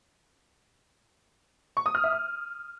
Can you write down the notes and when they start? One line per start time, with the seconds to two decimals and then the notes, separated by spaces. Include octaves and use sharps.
1.77 C#6
1.86 D#6
1.95 F6
2.04 E5
2.13 D#6